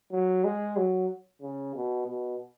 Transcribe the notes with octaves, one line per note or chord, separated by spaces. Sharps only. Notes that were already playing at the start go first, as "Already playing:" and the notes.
F#3
G#3
F#3
C#3
B2
B2